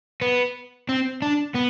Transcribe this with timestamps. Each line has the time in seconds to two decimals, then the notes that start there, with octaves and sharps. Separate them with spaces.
0.22 B3
0.89 C4
1.22 D4
1.54 B3